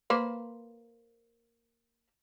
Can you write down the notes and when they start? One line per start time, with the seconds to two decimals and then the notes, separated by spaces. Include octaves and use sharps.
0.10 A#3 B4 C5